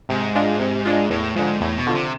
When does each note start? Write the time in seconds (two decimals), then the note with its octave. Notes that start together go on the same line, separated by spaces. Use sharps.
0.09 G#2 C3
0.35 G#3 D4 F4
0.60 C3
0.85 G#3 D4 F4
1.10 E2 A2
1.36 G#2 D3 F3
1.61 E2 A2
1.78 B2
1.87 D3 F3
1.95 C3